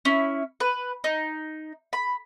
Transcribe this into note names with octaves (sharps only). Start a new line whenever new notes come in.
C#4 E4
B4
D#4
B5